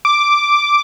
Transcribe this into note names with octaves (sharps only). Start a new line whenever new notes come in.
D6